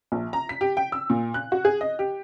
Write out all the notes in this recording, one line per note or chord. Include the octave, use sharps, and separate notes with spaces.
A#1
A#5
B6
G4
G5
E6
A#2
F#6
F#4
G#4
D#5
G4